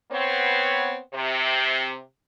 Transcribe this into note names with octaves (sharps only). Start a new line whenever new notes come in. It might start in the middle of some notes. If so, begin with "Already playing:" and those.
B3 C4 C#5
C3